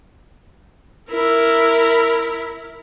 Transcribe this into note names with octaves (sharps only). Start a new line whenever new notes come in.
E4 A#4